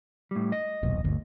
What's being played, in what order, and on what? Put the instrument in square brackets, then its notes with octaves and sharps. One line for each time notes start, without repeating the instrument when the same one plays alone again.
[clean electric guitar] A2 G3
D#5
[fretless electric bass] D#1 B1
G1 D2